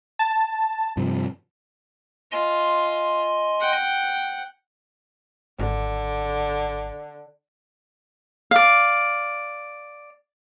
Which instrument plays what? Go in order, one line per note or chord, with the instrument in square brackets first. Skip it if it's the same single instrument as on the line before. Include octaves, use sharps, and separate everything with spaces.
[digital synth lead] A5
[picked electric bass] G2 C3 F3
[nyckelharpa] F4 [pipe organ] D#5 G#5 C6
[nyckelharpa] F#5 G5
[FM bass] G#1 [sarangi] D3
[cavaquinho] D5 F5